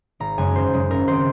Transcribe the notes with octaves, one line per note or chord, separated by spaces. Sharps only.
G#1 A#5
F#2 C#3 G#3 G#5
G#1 C5
F#2 C#3 G#3
G#1 A#4
D#3 G#3 C4 C5